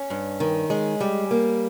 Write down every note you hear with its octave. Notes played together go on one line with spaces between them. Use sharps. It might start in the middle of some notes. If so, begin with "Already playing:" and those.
Already playing: C#4
G2
D#3
G#3
G3
A#3